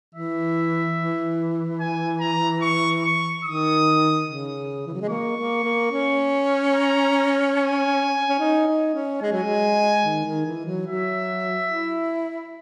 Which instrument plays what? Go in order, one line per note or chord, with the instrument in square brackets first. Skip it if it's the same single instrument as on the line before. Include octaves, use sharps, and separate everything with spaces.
[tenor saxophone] E3 [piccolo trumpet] E5
[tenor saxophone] E3
[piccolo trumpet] G#5
A#5
C#6
C#6
[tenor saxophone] D#3 [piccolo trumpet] D#6
[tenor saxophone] C#3
E3
F#3
G#3
[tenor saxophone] A#3 [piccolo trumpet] C#6
[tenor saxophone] A#3
A#3
C#4
[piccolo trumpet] A#5
G#5
[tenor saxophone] C#4
D#4
D#4
C#4
[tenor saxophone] G#3 [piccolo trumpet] G#5
[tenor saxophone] F#3
G#3
D#3
D#3
E3
F#3
[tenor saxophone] F#3 [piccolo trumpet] E5
[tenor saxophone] E4